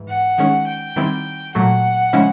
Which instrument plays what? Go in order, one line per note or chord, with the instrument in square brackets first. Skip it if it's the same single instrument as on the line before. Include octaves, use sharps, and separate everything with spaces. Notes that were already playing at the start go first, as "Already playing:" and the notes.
Already playing: [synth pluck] G#2 E3
[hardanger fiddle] F#5
[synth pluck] D#3 G#3 C#4
[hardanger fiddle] G5
[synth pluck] D#3 G3 C4 E4
[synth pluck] A#2 F#3 A3 [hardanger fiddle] F#5
[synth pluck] C#3 F3 G#3 C#4 E4